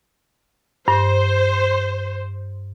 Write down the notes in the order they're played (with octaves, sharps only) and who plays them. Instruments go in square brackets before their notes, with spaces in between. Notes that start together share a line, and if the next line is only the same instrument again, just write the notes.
[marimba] G2 [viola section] C5